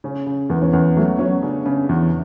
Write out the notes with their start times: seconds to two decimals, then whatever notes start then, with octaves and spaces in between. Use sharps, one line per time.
0.04 C#3 C#4
0.27 C#3
0.50 E2 B3
0.62 C#4
0.73 E2 B3
0.97 F#3 A3
1.19 F#3 C#4
1.42 C#3 D4
1.65 C#3 C#4
1.89 E2